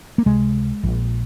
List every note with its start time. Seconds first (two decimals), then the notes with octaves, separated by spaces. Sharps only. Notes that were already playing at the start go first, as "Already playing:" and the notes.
0.18 A#3
0.25 C#2 C3 G#3
0.83 A#1 A#2